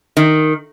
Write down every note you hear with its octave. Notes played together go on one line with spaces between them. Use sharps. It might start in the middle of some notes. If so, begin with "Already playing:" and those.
D#3